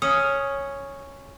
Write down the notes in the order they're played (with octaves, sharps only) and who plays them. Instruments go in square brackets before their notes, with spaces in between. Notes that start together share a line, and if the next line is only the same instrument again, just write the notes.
[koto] C#4 [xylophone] D#6